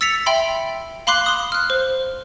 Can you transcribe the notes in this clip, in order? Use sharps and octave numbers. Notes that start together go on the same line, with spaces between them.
E6 A6 B6 C#7 F7
E5 G5 B5 C6
F5 B5 C6 D6 F#6 C7
C6 D#6
F6 F#6
C5